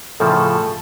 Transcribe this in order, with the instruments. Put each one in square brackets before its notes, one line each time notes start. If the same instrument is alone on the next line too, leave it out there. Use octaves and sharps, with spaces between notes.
[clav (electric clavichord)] A2 C#3 F3 [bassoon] A4